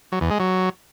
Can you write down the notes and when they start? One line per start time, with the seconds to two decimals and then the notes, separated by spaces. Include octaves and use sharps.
0.12 F#3
0.21 E2
0.31 G#3
0.40 F#3